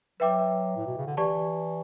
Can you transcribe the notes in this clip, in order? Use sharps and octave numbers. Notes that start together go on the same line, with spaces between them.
F#3 B4 E5 G5 D6
A2
B2
C#3
D3
E3 G4 D5 A5 C#6